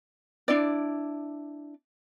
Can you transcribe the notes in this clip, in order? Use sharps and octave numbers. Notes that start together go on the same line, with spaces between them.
D4 E4 D5